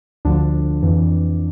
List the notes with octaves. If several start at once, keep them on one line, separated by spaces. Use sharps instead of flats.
D2 D3 F3 D4
F2 E3